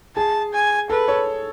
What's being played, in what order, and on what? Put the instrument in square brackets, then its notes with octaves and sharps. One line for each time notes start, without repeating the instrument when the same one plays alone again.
[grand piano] G#4 [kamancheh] A5
[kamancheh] G#5
[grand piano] A4 [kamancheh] B4
[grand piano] A4 C#5